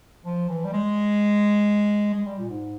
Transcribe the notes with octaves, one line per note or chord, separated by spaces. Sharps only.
F3
E3
G3
G#3
G#3
G3
A#2
G#2